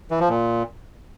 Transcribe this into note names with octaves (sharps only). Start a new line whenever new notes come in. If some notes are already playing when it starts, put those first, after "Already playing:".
E3
F3
A#2